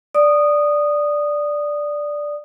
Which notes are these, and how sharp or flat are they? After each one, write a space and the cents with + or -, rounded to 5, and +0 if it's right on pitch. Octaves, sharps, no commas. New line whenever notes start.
D5 +0 D#6 -15